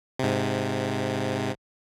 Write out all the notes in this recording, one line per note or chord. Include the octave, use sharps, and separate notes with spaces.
G#2 C3